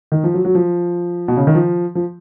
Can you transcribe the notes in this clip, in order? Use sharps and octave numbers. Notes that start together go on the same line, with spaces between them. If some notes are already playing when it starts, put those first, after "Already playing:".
D#3
F3
F#3
F#3
F3
B2
C#3
D#3
F3
F3